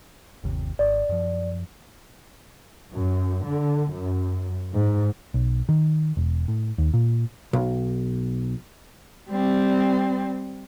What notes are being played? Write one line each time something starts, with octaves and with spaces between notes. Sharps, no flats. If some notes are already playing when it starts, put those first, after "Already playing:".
G1 D#2 C3
G#1 D5
F#2 F3
F#2
D3
F#2
G#2
B1
D#3
E1
A2
D#2
A#2
B1
G3 C4